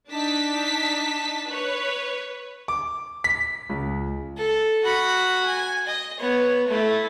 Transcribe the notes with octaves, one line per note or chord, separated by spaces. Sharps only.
D4 D#4 A5 B6
B4 C#5
D6
B6
C#2
A4
F#4 B5
G#5
D#5
B3 C#5
A3 E4